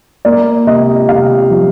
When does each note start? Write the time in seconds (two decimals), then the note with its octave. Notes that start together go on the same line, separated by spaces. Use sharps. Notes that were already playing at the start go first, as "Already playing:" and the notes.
0.25 A#3 D5
0.67 C3 D#5
1.09 C3 F5
1.51 F3